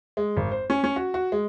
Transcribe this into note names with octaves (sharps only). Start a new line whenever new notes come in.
G#3
G#1
C5
C#4
C#4
F#4
F#4
G#3